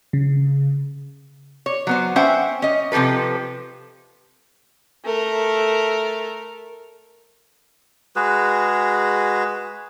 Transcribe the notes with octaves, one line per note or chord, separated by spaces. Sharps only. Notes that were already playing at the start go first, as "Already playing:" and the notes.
C#3
C#5
F#3 B3 C5
C#4 C5 E5 F#5 G5
C#4 D#5
C3 F3 G4 A4 B4
A3 A#4
G#3 F#4 G#4 B4